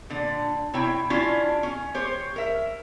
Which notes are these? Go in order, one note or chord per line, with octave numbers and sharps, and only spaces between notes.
A#2 D3
C3 E4 C#5 G5
C#4 D4 E4 F4 G4
C#4
G4 C5 C#5
A#4 E5